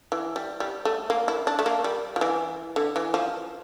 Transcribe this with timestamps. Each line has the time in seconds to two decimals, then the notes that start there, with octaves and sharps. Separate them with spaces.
0.12 E3
0.36 G3
0.60 G3
0.85 A3
1.10 A#3
1.28 E4
1.47 D4
1.59 A3
1.66 A#3
1.84 G3
2.16 F3
2.21 E3
2.76 D3
2.96 E3
3.14 F3